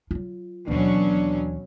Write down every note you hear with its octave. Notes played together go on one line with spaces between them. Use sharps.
F#3 F4
D#2 B2 E3 F#3 C#4 D4